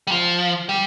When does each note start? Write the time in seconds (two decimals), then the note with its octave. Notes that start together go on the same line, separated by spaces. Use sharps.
0.07 G3
0.12 F3
0.69 G3